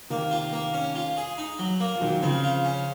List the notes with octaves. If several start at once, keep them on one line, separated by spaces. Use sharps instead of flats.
C3 D#3 A#3
F4
A#3
C#4
F4
G#4
D#4
F#3
A#3
F3
A#2 D#3 F#3
C#3 F3 C4
F4
C#4